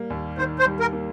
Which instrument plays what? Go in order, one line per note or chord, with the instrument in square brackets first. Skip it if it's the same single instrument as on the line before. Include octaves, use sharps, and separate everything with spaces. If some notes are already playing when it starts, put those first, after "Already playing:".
Already playing: [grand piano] G3 A#3
D#2
[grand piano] D#3 [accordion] C5
[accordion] C5
[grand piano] G3
[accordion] A#4
[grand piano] A#3